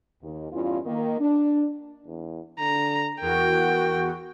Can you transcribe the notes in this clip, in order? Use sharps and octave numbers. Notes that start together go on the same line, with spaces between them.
D#2
E2 G2 C#4 E4 F4
D#3 A#3
D4
E2
D3 A#5
E2 F#4 A#4 G5